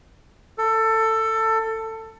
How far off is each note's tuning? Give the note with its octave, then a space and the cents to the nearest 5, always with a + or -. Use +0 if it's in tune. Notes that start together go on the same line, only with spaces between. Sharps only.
A4 +20